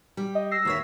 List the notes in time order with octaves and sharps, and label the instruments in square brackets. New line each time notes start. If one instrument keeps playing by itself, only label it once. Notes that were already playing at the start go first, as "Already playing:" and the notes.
[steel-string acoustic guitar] G3
[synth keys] D#5
E6 A#6 C7
[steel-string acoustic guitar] D#2 C#5 E5